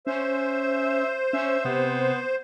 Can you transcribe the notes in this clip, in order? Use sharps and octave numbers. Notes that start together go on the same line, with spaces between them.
C#4 C5 E5
C#4 E5
C3 B3